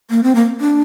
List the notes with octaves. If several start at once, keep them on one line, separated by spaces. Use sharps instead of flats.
A#3
C4
A#3
D4